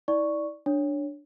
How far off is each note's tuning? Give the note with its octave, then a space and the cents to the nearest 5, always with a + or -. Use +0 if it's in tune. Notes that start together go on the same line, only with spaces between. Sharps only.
E4 -40 D5 +0 C#6 +0
D4 +0 C#5 +0